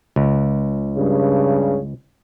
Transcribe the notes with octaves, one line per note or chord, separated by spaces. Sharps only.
C#2
G2 C#3